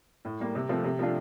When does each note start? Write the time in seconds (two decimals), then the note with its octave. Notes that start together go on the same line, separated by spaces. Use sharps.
0.25 A2
0.40 G3 A#3
0.55 C3
0.69 F3 A3 C4 F4
0.84 C3
0.99 F3 A3 D4 F4